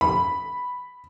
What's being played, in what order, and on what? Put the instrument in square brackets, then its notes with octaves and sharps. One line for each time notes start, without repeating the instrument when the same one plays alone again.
[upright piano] B5